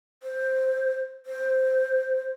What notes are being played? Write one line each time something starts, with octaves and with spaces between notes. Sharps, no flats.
C5
C5